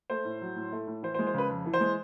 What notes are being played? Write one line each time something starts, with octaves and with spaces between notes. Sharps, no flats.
A3 C5
A2
F#3
A2
A3
A2
E3 C5
C5
G#3
C5
C#3 B4
F2
E3
C5
G#3